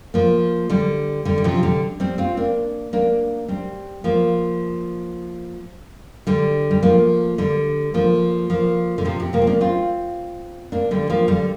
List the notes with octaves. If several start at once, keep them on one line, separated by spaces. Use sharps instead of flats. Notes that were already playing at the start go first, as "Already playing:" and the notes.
F3 A#3
D3 G3
D3 G3
G3
C3 F3
D3 G3
G3 C4
C4 F4
A#3 D4
A#3 D4
G3 C4
F3 A#3
D3 G3
G3
F3 A#3
D3 G3
F3 A#3
F3 A#3
D3
C3 F3
C3
F3 A#3
C4
A#3 D4
C4 F4
A#3 D4
D3 G3
F3 A#3
D3 G3